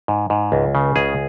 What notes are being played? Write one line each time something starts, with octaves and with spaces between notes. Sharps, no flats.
G#2
G#2
C#2
C#3
C#2 G#4